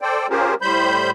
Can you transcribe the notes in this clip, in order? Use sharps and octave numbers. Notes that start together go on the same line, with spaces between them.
A4 C5 D5 G5
C#4 F4 G4 G#4 A#4 C5
A2 G3 C5 B5 G6